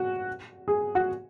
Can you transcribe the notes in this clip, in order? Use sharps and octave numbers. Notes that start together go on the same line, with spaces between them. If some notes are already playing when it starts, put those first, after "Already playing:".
Already playing: F#4
G#4
F#4